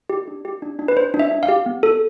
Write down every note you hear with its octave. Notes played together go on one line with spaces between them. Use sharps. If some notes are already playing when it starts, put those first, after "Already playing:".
G4
D4
G4
D4
D4
B4
D4 C5
D4
E5
D4
F5
G4
B3
A4